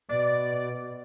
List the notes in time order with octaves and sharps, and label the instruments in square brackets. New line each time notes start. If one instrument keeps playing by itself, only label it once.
[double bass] B2 [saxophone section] D5